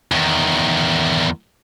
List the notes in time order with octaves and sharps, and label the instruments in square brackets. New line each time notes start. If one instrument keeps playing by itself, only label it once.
[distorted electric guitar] E2 D#3